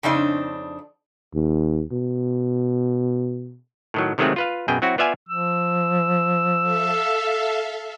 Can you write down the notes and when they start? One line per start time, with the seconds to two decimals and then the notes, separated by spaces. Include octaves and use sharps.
0.03 F2 C#3 C4 D4 D#4
1.34 D#2
1.92 B2
3.94 A2 D#3 F#3
4.18 C3 D#3 F#3 G#3 A3 C4
4.36 F4 B4 F5
4.68 F#2 B2 G#4 G5
4.82 F#3 C4 E4 F#4
4.98 B3 F4 D5 E5 F5 G#5
5.29 F3 E6
6.62 A4 E5 F5